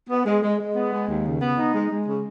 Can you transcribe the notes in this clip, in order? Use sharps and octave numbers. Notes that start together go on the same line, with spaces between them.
B3
G#3
G#3
G#3
B3
G#3
D#2
C#3
B3
D#4
G#3
G#3
C#3